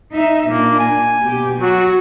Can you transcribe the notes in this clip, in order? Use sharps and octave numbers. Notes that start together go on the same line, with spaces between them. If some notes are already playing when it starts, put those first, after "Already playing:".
D#4 E5
A#2 A#3 D4
G#5
B2 G4
F#3 F#4